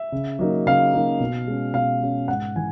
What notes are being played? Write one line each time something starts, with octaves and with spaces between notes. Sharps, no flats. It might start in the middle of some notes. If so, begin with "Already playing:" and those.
Already playing: E5
C#3
F#3 A#3 D#4
C#3 F5
F#3 A#3 D#4
B2
G#3 C#4
B2 F5
G#3 C#4
G#2 F#5
E3 G#5